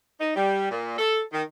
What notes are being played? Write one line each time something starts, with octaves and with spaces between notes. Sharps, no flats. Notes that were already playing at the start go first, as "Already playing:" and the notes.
D#4
G3
A#2
A4
D#3